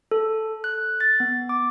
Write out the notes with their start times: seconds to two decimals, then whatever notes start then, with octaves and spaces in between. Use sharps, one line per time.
0.11 A4
0.64 F#6
1.01 A6
1.20 B3
1.49 D6